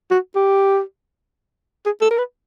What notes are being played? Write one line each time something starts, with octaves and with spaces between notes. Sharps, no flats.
F#4
G4
G#4
A4
A#4
B4